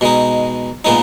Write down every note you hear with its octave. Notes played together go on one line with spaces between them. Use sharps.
B2 G#3 D#4
A#2 G#3 B3 D#4